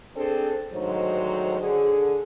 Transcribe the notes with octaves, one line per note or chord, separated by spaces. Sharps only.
C4 D4 G#4 A4
D2 G#2 D#3 F#3 C5
D3 G#4